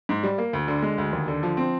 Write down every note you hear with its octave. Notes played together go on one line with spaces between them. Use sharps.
G#2
G3
A#3
D2
D3
G#3
D2
D#2
D3
F3
C4